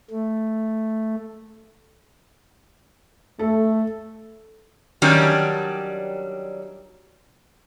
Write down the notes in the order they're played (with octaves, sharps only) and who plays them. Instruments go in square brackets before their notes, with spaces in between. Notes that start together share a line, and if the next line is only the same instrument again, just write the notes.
[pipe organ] A3
[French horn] A3 [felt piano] A4
[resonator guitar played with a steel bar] D#3 F#3 G3 C#4 D4